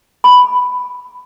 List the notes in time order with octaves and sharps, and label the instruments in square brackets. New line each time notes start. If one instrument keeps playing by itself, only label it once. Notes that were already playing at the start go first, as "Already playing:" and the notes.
[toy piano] B5